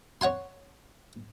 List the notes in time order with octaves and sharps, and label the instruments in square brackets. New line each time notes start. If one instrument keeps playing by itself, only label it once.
[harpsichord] C#5 F#5 G#5 C6